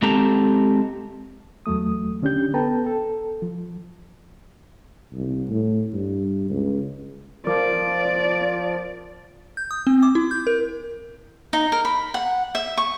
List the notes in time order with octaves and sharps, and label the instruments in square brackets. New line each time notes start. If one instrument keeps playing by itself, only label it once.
[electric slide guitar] G#3 C4 G4 A4 A5 A#5
[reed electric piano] E2 F#3 A3 D#6
D3 C#4 D4 G4 G6
B3 A4 B4 G5 A5 A#5
A4
F3
[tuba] C2
A2
G2
C#2
[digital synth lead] F3 [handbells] A#4 D6 [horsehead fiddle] D5
[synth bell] G6
D#6
C4
D6
E4
G6
A#4
[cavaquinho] D#4
A#4
B5
F#5
E5
C#6